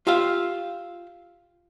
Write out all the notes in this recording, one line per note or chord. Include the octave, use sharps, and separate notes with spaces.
F4 G4 E5 F5